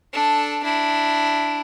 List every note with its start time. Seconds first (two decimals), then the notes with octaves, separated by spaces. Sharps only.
0.13 D4 A4
0.63 D4 E4